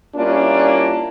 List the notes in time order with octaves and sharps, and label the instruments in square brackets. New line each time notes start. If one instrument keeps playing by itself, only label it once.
[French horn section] G3 A#3 C#4 D4 E4 F4